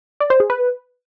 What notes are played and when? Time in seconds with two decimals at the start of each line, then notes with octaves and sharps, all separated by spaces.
0.20 D5
0.30 C5
0.40 G#4
0.50 B4